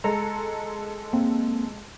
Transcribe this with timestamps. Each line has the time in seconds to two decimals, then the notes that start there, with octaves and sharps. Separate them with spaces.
0.04 G#3 A4 A#5
1.13 A#3 C4